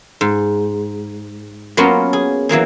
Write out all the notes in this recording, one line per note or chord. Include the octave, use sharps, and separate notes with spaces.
G#2
F#3 A#3 B3 C#4 F4
G#4
E3 F#3 A#3 G#4